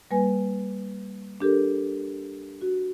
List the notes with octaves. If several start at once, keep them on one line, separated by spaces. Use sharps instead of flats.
G3 A#3 B4 G#5
D4 G4 A4 A#4
F#4